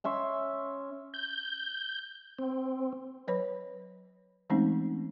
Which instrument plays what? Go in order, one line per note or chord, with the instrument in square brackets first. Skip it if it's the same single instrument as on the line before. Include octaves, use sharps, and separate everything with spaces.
[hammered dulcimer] C#4 E5 C6 C#6
[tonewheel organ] G6
C4
[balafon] F#3 B4 C#5 B5
E3 G#3 A3 C4 C#4 D#4